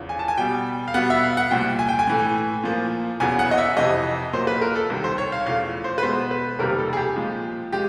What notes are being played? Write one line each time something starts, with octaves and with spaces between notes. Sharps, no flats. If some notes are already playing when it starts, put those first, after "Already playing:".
Already playing: E2 C#3 F3
G#5
A5
G#5
B2 G3 B3 G5
F5
B2 G3 B3 F#5
E5
F5
F#5
C2 A#2 F3 G5
G#5
G5
G#5
A2 E3 A3
A#2 F3 A#3
E2 C#3 F#3 B3 G#5
F#5
D#5
E5
F2 C3 E3 D#5
A#2 F#3 A#3 C5
B4
A#4
A4
C2 C3 D#3
C5
C#5
F5
E2 C#3 F3 A3 F5
C5
B4
B2 G#3 B3 C5
B4
F2 C3 D#3 G3 A#3 A#4
A4
G#4
G4
A#2 F3 G#3
F3 G#3 G4